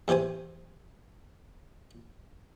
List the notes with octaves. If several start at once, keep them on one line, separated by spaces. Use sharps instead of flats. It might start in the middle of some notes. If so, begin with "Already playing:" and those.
E2 E3 G4 C5 G#5